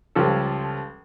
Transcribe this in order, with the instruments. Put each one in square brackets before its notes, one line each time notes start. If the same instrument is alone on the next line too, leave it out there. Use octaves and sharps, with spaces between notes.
[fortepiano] C#2 F3 G3 C#4 A4